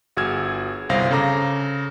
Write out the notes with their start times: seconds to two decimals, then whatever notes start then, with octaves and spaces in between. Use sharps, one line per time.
0.17 G1 F#4 G#4 E6 F6 G#6
0.89 G1 C2 C5 F5 A#6
1.11 C#3 A4 A#5 D6 A#6